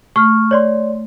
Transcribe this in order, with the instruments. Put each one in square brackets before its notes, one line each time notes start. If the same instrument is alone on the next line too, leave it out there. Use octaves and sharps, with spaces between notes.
[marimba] A3 [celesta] C#6 F6
[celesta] C#5 D5 C6